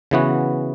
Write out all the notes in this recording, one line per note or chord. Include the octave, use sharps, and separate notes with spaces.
C#3 E3 B3 F#4